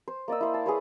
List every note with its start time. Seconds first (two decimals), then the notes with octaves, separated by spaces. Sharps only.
0.08 C5
0.28 A#3 D5 D#5 E6
0.41 E4 C5
0.54 A5
0.66 G#4 B4 C#5